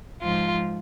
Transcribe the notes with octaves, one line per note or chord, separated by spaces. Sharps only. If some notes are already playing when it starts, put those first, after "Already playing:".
G#2 F3 F4